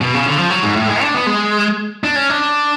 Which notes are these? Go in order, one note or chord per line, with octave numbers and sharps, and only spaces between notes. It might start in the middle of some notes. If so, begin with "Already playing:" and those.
B2
C#3
D3
F3
F#3
G#2
A2
G#3
D4
B3
G#3
D4
C#4
D4